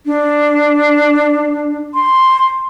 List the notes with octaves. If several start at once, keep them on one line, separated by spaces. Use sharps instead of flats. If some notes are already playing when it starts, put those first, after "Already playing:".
D4
C6